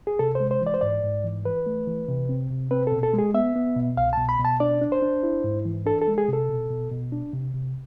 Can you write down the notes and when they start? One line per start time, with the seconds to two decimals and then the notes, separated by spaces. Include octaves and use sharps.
0.07 G#4
0.19 C3 A4
0.35 C5
0.40 G#3
0.51 C5
0.61 E3
0.67 D5
0.74 C5
0.81 G#2 D5
1.03 G#2
1.24 E3
1.45 E3 B4
1.66 A3
1.87 E3
2.08 C3
2.29 C4
2.50 C3
2.71 C4 B4
2.87 B2 A4
3.03 A4
3.14 G#3
3.19 G#4
3.34 B3 E5
3.56 B3
3.76 B2
3.97 C2 F5
4.13 A5
4.18 B2
4.29 B5
4.39 B2
4.45 A5
4.60 D4 D5
4.81 D4
4.92 C5
5.02 D4
5.23 E4
5.44 G#2
5.65 E3
5.86 D4 A4
6.02 A4
6.08 G#3
6.18 G#4
6.28 C3 A4
6.49 B2
6.70 B2
6.91 B2
7.12 D4
7.33 C3
7.54 C3